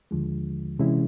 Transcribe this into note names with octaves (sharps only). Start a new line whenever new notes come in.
D#2 D3 F3 G#3
C3 E3 G#3 C#4 E4